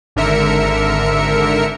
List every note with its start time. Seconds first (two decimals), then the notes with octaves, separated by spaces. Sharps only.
0.16 G#1 D3 A#4 E5 C#7